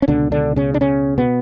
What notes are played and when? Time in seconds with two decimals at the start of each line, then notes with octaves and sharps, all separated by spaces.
0.02 C#4
0.08 C#2 B2 D3 D4
0.32 D3 D4
0.56 C#3 C#4
0.74 D4
0.81 C#3 C#4
1.18 B2 B3